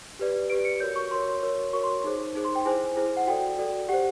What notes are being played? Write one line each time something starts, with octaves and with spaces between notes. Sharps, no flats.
G4 B4 D5
G4 B4 D5 D7
C#7
F#4 A#4 C#5 G6
C#6
F#4 A#4 C#5 C6
F#4 A#4 C#5
F#4 A#4 C#5 C#6
C6
D#4 G#4 C5
D#4 G#4 C5
C6
G5
E4 G#4 C5 G#5
E4 G#4 C5
F#5
F#4 A4 D5 G5
F#4 A4 D5
G4 C5 F#5